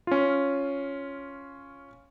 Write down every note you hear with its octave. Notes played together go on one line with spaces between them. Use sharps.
C#4 F4